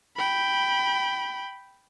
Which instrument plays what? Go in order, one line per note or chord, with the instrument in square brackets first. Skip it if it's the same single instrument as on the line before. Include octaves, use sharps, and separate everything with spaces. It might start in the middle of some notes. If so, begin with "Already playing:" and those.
[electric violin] G5 B5